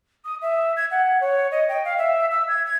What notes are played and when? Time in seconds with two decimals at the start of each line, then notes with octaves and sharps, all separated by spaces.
0.25 D#6
0.42 E5
0.77 G#6
0.91 F#5
1.21 C#5
1.52 D#5
1.69 G5
1.85 F5
1.98 E5
2.31 E6
2.48 G#6
2.66 G#6